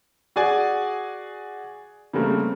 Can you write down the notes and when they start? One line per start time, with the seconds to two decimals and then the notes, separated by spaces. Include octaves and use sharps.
0.36 F#4 G#4 D5 G#5
2.13 C#3 G3 A3 A#3 C4